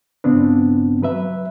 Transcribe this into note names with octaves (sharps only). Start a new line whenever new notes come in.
G2 C#3 B3 C4 D4
F#3 B4 E5